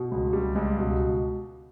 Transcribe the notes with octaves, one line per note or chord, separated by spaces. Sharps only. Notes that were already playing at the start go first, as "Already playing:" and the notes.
Already playing: B2
C#2
G3
C#2
B2